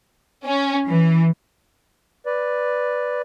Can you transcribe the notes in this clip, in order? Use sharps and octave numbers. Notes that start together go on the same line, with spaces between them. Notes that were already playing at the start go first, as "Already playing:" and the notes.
C#4
E3
B4 D5